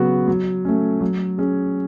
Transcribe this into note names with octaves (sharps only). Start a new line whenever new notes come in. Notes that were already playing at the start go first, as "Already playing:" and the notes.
Already playing: C#3 F#3 B3 F#4
F#3
A3 C#4
F#3
C#4 G#4